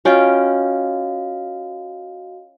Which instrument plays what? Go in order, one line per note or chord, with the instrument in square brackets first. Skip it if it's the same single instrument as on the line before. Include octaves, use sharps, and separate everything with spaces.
[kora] C#4 F4 G5 [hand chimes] F#4 D#5 F5